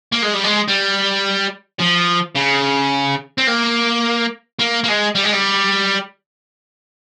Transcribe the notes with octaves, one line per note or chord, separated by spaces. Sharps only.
A#3
G#3
G3
G#3
G3
F3
C#3
C4
A#3
A#3
A#3
G#3
G3
G#3
G3